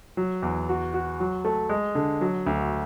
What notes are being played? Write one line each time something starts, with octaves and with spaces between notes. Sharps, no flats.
F#3
E2
F#4
F#4
F#3
A3
G#3
D3
F#3
D2